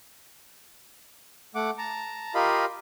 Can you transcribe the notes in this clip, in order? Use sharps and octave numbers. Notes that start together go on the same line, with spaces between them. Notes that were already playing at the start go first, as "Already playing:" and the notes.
A3 F#5 D6
A5 A#5
F4 G4 A#4 D#5 F5 B5